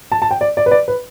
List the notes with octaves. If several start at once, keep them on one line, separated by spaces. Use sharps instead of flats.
A5
A5
G5
D5
D5
B4
D5
B4